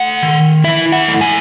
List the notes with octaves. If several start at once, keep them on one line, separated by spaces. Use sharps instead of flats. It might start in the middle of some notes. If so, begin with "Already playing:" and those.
Already playing: A3 F#5
D#3
E4 E5
F#5
A3
G#5